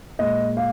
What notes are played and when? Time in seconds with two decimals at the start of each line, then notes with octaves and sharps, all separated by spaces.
0.19 A#2 G#3 D#5
0.57 F5